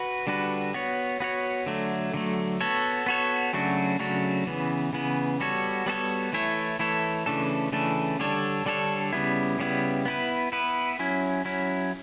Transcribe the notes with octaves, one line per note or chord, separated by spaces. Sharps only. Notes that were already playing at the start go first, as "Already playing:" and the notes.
Already playing: F#4 B4
D3 G3 D4 F#4 B4
B3 F#4 C#5
B3 F#4 C#5
D3 F#3 A3
D3 F#3 A3
B3 F#4 A4 C#5
B3 F#4 A4 C#5
C#3 F#3 A3 D4 F#4
C#3 F#3 A3 D4 F#4
C#3 E3 B3
C#3 E3 B3
G3 B3 F#4 A4 C#5
G3 B3 F#4 A4 C#5
E3 A3 E4 A4 C#5
E3 A3 E4 A4 C#5
C#3 E3 A3 D4 A4
C#3 E3 A3 D4 A4
D3 G3 D4 A4 C#5
D3 G3 D4 A4 C#5
C#3 G3 B3 E4
C#3 G3 B3 E4
B3 E4 B4
B3 E4 B4
F#3 C#4 E4
F#3 C#4 E4